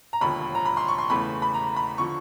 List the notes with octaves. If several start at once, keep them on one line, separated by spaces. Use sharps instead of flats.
A#5
E1 D#2 D3 F3 B5
A#5
B5
C6
C#6
C6
E2 C#3 E3 A3 B5
B5
A#5
B5
D3 F3 C#6